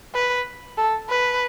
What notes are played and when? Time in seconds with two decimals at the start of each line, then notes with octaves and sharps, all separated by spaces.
0.15 B4
0.78 A4
1.09 B4